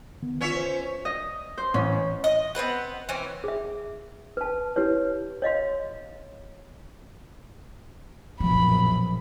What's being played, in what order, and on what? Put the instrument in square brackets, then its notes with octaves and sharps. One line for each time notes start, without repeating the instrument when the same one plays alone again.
[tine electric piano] D3 D#3 B3
[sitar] C#4 C#5 E5 [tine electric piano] F4 B4
[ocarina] C5
[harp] D#5
C5
[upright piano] A1 [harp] C#4
[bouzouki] D#5
B3 C4 B4 F#5
E3 C4 C#4
[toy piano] G#4 E5
B4 A5
E4 G4 B4 C#5
C#5 D#5 F5 C6
[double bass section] A#1 F#2 B2 [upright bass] F3 [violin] B5